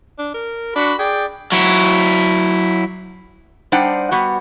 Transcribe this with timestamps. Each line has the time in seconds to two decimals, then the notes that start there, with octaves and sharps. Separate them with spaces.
0.18 D4
0.34 A#4
0.76 D4 F#4 B5
0.99 G#4 D5 G5
1.52 F#3 E4
3.72 G3 D4 D#4 C5 F#5 G5
4.11 G3 B3 F#4